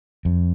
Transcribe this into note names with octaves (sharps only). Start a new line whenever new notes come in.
F2